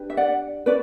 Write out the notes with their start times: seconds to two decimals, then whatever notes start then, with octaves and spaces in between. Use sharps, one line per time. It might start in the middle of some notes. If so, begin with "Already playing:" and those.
Already playing: D4 G4 B4
0.10 E5
0.17 D5 F#5
0.66 C#4 F#4 B4 D5